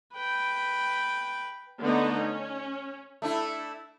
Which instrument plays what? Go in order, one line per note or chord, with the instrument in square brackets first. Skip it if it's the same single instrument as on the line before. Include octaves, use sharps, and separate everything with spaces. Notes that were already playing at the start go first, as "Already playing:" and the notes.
[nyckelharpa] B4 G5
[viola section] D3 A3 B3 D#4 D#5
C#4
[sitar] A3 D4 E4